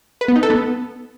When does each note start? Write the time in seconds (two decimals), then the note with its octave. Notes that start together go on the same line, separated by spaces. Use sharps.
0.21 B4
0.28 B3
0.36 D#4
0.43 A4
0.50 B3